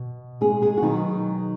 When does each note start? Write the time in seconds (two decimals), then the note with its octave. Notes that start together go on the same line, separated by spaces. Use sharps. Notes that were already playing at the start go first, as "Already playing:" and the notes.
Already playing: B2
0.41 G#3 G#4
0.62 G#3 G#4
0.77 F#4
0.82 B2 D#3 F#3 D#4